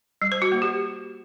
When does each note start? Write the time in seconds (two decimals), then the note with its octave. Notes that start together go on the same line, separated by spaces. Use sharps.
0.22 G3
0.32 C5
0.42 F#4
0.52 A#3
0.62 G4